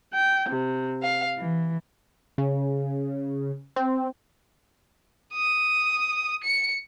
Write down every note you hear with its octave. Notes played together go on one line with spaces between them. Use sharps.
G5
C3
F5
E3
C#3
C4
D#6
C#7